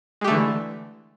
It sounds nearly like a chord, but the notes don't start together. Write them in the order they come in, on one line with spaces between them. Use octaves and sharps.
G#3 G4 A3 D3 E3